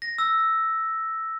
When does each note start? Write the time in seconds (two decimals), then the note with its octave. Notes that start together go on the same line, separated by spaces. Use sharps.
0.02 A#6
0.18 E6